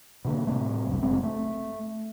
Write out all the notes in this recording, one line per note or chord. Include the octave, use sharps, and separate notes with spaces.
B2 D3 A#3
A2 C3 A3
F1 B1 G2
F#1 G#3 C4
A3